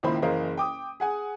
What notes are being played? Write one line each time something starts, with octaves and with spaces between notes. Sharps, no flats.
C#2 A#2 D#3 E4 C5 B5
F#1 E3 A#4 C5 D#5 F5
G5 D6 D#6
G#4 F#5 G#5